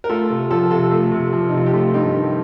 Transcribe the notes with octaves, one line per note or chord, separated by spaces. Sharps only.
A#4
A3 F4 A4
C3
F3 F4 A4
C3 F4 A4
A3
C3
F3
D#4
C3 F4
G4
A3 F4 A4
G2 D#4 G4
D#3